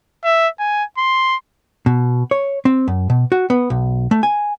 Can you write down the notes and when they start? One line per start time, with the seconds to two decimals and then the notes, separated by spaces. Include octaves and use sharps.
0.25 E5
0.59 G#5
0.98 C6
1.86 B2
2.31 C#5
2.65 C4
2.88 F#2
3.10 B2
3.32 F#4
3.50 B3
3.70 B1
4.11 A3
4.23 G#5